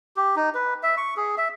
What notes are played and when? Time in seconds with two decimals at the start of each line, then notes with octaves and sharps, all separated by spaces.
0.16 G4
0.36 D#4
0.54 B4
0.83 E5
0.97 C#6
1.17 G#4
1.38 E5